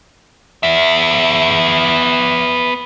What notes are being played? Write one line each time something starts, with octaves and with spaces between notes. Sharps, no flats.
B3 E5